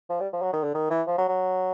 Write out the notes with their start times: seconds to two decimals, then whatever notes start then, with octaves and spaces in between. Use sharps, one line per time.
0.09 F3
0.20 G3
0.33 F3
0.42 F#3
0.53 D#3
0.63 D3
0.74 D#3
0.90 E3
1.07 F3
1.18 F#3
1.28 F#3